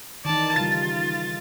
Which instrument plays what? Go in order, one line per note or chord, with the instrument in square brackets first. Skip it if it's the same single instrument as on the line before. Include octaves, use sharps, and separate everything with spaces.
[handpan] D#3 E3 D#4 [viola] D5 A5
[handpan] C#3 G3 [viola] F4 [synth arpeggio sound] A6